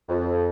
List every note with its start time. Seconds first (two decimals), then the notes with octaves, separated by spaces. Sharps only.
0.09 F2